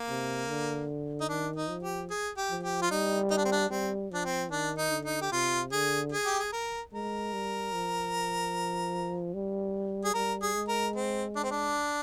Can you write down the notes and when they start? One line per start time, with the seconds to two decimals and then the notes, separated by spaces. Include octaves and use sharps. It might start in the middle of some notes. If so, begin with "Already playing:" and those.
Already playing: A#3
0.08 C3
0.49 D3
1.21 D#4
1.29 D#3 D4
1.56 D#4
1.69 F3
1.83 G4
2.10 G#4
2.37 G4
2.50 F3
2.63 G4
2.82 F4
2.90 G3 D#4
3.31 D#4
3.37 D4
3.45 C4
3.52 D4
3.71 G3 C4
4.11 F3 D4
4.25 C4
4.51 D#3 D4
4.78 D#4
4.91 D3
5.05 D#4
5.21 G4
5.32 C3 F4
5.72 D3 G#4
6.12 G#4
6.26 G4
6.39 G#4
6.53 A#4
6.93 G#3 A#4
7.33 G3
7.74 F3
9.34 G3
10.05 G#4
10.14 G3 A#4
10.42 G#4
10.56 G#3
10.68 A#4
10.96 C4
11.36 D4
11.43 C4
11.51 D4